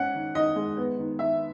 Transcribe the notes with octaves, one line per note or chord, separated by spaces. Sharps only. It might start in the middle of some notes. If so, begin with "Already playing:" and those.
Already playing: G#2 C#4 F#5
D#3
D#3 D#5
G#3
B3
D#3
D#3 E5